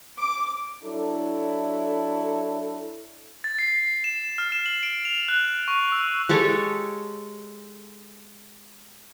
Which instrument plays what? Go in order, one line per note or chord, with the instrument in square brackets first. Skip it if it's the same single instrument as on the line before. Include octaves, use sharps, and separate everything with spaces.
[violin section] D6
[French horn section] F#3 D4 E4 A4
[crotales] A6
C7
E7
F6
E7
F#7
D7
F7
F#6
C#6
E6
[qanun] G#3 G4 A4 C#5